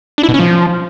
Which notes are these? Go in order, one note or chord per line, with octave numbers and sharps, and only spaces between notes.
D4
E4
B2
C#4
F3